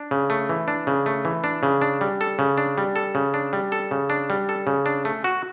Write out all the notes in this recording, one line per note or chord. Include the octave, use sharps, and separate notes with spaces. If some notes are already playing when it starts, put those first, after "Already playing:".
Already playing: D4
C#3
A3
E3
D4
C#3
A3
E3
D4
C#3
D4
G3
A4
C#3
D4
G3
A4
C#3
D4
G3
A4
C#3
D4
G3
A4
C#3
D4
A3
F#4